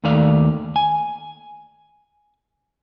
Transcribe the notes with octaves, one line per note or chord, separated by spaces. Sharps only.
D#2 D#3 A3 D5 F5
G#5